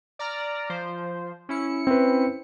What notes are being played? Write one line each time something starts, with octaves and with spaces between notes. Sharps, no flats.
D5 A#5 F6
F3 C5
C#4 E4 C#7
C4 B4